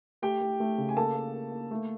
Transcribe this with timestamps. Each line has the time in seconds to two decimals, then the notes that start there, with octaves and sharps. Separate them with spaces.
0.22 A3 G4 G5
0.41 A3
0.60 A3
0.78 C#3
0.89 G#5
0.96 A#3 A4 A5
1.15 A#3
1.34 A#3
1.52 A#3
1.71 A3